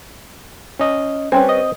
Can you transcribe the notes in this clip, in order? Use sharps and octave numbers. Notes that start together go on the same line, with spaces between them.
C#4 D#5
G3 C4 C#4 B4 G#5
D#5 D#6